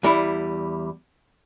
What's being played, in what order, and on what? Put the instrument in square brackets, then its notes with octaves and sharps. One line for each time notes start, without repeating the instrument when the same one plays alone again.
[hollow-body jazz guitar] E2 G3 E4